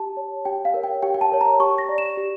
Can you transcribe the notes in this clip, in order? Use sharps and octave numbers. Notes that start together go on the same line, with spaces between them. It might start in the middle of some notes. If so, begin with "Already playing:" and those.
Already playing: G4 A5
C#5
G4 G5
F5
A#4 C#5
G5
G4 G5
G5
A5
A#4 C#5
A#5
G4 C#6
A#6
D5
E7
G4